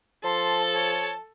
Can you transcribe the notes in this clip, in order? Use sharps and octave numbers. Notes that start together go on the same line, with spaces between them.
F3 A4 A5 C6
C#5